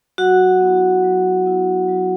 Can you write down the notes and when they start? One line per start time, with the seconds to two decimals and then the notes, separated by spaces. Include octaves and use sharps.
0.18 F#3 F#4 F#5
0.61 B3 E4
1.04 F#3
1.46 B3 E4
1.88 F#3